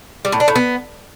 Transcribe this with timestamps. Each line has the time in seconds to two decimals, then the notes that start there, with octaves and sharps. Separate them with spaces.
0.25 G3
0.32 A2
0.40 D4
0.48 A2
0.56 B3